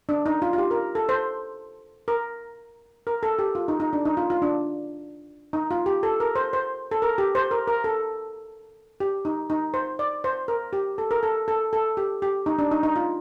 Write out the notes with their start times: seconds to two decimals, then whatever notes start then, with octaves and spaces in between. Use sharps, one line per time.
0.09 D4
0.26 D#4
0.42 F4
0.53 F4
0.58 G4
0.71 A#4
0.95 A4
1.09 C5
2.08 A#4
3.07 A#4
3.23 A4
3.39 G4
3.55 F4
3.68 D#4
3.80 D#4
3.93 D4
4.05 D#4
4.17 F4
4.30 F4
4.42 D4
5.53 D#4
5.71 F4
5.86 G4
6.03 A4
6.20 A#4
6.36 C5
6.53 C5
6.91 A4
7.02 A#4
7.18 G4
7.35 C5
7.51 A#4
7.68 A#4
7.84 A4
9.00 G4
9.25 D#4
9.50 D#4
9.74 C5
9.99 D5
10.24 C5
10.48 A#4
10.73 G4
10.98 A4
11.11 A#4
11.23 A4
11.48 A4
11.73 A4
11.97 G4
12.22 G4
12.46 D#4
12.59 D4
12.71 D#4
12.83 D#4
12.96 F4